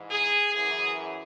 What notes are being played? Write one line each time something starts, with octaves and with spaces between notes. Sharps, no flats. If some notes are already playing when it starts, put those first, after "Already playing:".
Already playing: G#2 E3
G#4
F#2 E3 G#4